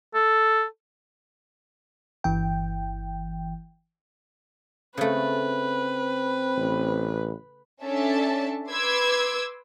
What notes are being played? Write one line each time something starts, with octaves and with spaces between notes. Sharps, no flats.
A4
G1 E3 G5
C#3 A3 C4 B4
A1
C#4 D4 A4 E5 A5
B4 C6 D6 E6 G#6